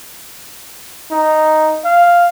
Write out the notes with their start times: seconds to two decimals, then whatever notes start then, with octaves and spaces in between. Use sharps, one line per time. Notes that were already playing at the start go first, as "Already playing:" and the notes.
1.11 D#4
1.85 F5